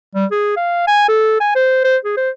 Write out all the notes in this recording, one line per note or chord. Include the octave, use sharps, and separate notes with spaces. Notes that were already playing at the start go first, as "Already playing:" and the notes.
G3
G#4
F5
G#5
A4
G#5
C5
C5
G#4
C5